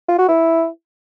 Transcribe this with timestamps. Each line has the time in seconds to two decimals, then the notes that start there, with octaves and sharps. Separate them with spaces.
0.09 F4
0.19 F#4
0.29 E4